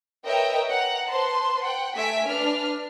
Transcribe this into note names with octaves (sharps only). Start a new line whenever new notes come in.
A#4 B4 C#5 D#5 E5 G5
F#5 A#5
B4 C5 A5 C6
F#5 G5
A3 E5 G#5 B6 D7
D4 B4 F6